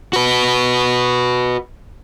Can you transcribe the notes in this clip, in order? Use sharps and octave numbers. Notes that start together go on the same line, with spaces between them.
F#4 B4